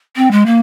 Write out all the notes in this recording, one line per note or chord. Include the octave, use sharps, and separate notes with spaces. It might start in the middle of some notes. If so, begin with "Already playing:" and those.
C4
G#3
A#3